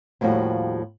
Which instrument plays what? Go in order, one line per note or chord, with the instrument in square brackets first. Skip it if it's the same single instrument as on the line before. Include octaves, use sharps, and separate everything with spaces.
[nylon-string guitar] D#2 A2 F3 G3 F#4